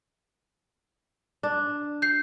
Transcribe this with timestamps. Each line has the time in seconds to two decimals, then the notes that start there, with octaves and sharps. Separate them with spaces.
1.43 D4
2.02 G6 C7